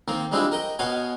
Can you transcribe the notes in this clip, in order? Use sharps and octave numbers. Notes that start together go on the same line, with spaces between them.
D#3 A#3 C4
G3 G#3 C4 D4 E4 F4
A#4 D#5 G5
B2 F#4 C#5 D#5 F5 G#5